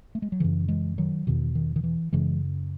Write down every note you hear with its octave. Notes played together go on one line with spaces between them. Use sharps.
A3
G#3
F#3
F#2 C#3 E3
E3 G#3
D#3 F#3
E2 B2 D#3
D#3
D#3
E3
F#2 C#3 E3 G#3